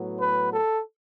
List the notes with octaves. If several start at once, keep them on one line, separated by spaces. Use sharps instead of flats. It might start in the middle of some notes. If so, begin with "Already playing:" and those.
Already playing: A2 F#3 B3
B4
A4